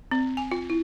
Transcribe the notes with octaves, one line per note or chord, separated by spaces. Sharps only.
C4
G#5
F4
E4